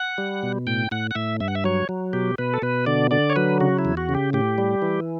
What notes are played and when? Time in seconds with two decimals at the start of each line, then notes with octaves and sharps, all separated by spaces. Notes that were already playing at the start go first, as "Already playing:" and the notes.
Already playing: F#5
0.18 G3
0.43 B2
0.67 A2 G5
0.91 A2 F#5
1.11 F#5
1.15 A2 E5
1.40 G2 E5
1.48 F#5
1.55 E5
1.64 F#3 C#5
1.89 F#3
2.13 B2 G4
2.38 B2 B4
2.54 A4
2.62 B2 B4
2.86 D3 D5
3.11 D3 D5
3.30 C#5
3.36 F#3 B4
3.60 C#3 F#4
3.79 E4
3.85 E2
3.97 F#4
4.09 C#3
4.15 G4
4.33 A2 G4
4.58 G3
4.82 E3